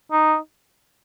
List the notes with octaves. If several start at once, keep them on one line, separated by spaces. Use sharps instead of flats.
D#4